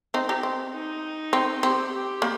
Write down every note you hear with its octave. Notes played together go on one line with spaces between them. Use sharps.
C4 D#4
D#4 G4
C4
D#4
C4
C4 G4
G4
A#3